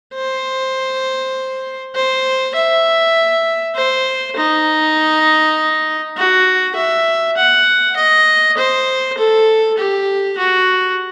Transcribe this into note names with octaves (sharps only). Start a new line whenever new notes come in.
C5
C5
E5
C5
D#4
F#4
E5
F#5
D#5
C5
A4
G4
F#4